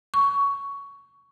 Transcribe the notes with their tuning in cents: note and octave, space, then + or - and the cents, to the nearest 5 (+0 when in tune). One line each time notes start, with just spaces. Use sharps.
C#6 +15